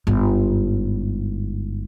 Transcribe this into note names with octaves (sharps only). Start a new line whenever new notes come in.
G1 G#2